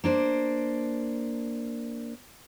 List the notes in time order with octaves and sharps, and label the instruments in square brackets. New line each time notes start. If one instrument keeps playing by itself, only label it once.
[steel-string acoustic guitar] A#3 D4 C5